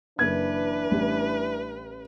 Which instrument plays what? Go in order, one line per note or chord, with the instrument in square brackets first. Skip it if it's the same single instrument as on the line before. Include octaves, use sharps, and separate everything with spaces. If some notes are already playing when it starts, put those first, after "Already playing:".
[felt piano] F#1 G#6 [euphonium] E3 [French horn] D4 [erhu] B4
[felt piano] A1 G3